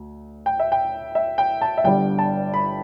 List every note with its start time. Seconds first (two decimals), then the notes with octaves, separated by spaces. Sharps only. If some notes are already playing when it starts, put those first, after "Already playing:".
Already playing: D2
0.46 G5
0.60 E5
0.72 G5
1.15 E5
1.38 G5
1.62 A5
1.78 E5
1.84 G1 G2 D3 G3 G5
2.19 A5
2.54 B5